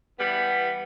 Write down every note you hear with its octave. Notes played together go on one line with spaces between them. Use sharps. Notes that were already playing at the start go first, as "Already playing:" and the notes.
E3 G3 B3